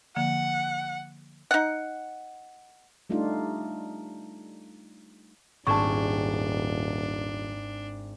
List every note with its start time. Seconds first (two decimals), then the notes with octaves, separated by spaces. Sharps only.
0.16 D3 F3 A#3 F#5
1.51 D#4 F#5
3.10 G3 A3 D4 D#4 F4
5.67 D#1 G#1 D4 G#4 A5 C#6 E7